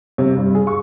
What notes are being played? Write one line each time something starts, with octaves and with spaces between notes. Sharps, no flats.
C3
G2
G#4
C#6